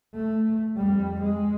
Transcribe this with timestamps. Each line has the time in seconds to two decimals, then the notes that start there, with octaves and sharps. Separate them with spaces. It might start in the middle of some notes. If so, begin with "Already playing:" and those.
0.15 A3
0.77 F2 G3
1.21 G#3